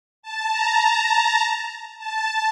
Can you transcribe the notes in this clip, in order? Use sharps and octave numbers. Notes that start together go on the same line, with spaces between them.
A5
A#5
A5
A5
A5